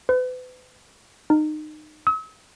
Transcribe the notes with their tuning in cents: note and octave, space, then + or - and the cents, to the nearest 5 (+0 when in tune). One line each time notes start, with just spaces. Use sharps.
B4 +40
D#4 -25
E6 -45